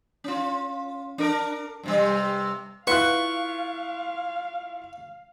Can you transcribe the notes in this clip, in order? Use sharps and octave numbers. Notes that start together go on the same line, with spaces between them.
C#4 F4
D4 A#4
G2 C3 G3
E4 F4 B4 F5 F#5 C6 C#6 F#6